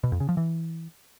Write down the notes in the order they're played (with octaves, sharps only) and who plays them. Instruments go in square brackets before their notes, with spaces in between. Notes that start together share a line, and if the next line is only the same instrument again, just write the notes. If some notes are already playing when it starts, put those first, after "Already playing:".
[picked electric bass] B2
F2
C#3
F3
E3